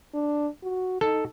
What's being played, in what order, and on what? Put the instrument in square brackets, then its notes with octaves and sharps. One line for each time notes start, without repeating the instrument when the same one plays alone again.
[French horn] D4
F#4
[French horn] D#4 [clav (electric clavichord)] A4